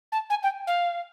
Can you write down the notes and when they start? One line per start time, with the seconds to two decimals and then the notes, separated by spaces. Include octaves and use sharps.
0.12 A5
0.30 G#5
0.43 G5
0.67 F5